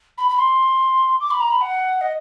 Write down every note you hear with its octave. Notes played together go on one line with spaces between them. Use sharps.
B5
B5
C6
D6
B5
A#5
B5
F#5
D#5